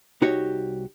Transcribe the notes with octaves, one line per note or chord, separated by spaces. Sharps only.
C2 D#4 F#4 G4 C#5